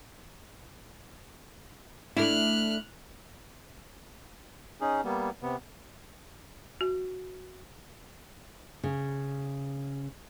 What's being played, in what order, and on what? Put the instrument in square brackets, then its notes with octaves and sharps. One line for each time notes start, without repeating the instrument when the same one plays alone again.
[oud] A3 D4 [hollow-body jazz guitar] E4 [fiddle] F6 F#6
[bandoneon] C#4 D#4 G#4
G3 A#3 B3
C3 B3
[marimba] F#4
[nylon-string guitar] C#3